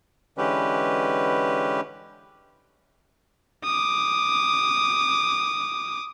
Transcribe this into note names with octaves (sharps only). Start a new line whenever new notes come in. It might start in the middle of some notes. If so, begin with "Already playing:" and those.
D3 E3 G#3 C#4 G4 B4
D6 D#6